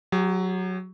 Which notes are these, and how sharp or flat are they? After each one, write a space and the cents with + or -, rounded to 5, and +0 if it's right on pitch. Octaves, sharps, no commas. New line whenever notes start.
F#3 +0 G4 +45